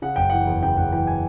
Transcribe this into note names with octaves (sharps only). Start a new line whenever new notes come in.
C#3 F#5
F#1 G5
E3 F#5
E2
C#3 G5
F#1 F#5
E3 G5
G#5